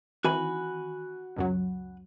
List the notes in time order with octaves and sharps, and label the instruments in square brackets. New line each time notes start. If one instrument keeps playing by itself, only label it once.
[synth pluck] D#3 E3 C4 [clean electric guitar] F#4 G#5 B5
[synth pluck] C#2 F#2 F#3